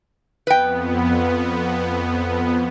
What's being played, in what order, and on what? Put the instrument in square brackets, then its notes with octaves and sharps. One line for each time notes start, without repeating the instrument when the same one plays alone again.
[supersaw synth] F2 B3 [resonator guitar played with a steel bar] B4 G5